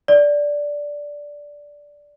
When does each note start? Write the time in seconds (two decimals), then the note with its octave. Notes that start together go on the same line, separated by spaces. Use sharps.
0.08 D5